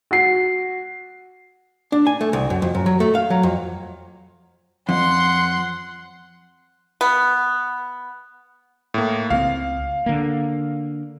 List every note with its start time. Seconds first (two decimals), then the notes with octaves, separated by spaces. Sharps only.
0.11 F#4 C7
1.92 D4
2.07 G#5
2.21 A3
2.33 C2
2.50 F#2
2.62 F2
2.75 F#2
2.86 F#3
3.00 A3
3.15 F5
3.30 F#3
3.43 F2
4.89 F2 F#5 C6
7.01 B3
8.94 A2 A#3
9.30 C#2 F#3 C4 F5
10.06 D3 A#3